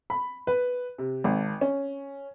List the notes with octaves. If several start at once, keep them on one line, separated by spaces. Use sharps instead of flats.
B5
B4
C3
G#1
C#4